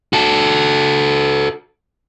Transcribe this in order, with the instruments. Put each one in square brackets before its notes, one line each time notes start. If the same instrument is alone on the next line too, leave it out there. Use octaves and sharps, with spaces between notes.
[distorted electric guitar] F#4 A4